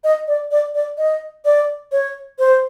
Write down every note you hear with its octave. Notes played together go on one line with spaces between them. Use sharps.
D#5
D5
D5
D5
D#5
D5
C#5
C5